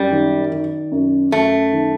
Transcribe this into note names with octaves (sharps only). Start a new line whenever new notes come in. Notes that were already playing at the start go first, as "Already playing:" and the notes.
Already playing: F#2 G3
D#3
D#3
F#2
F#2 A3
D#3